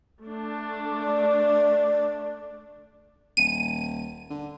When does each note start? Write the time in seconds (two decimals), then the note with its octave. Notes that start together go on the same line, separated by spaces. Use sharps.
0.22 A3 D4
1.03 D5
3.37 D#1 D#7
4.30 D3